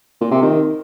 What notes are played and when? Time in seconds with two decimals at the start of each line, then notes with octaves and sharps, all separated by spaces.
0.21 A#2
0.32 C3
0.42 D#3